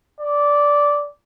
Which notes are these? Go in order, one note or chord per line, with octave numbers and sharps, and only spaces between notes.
D5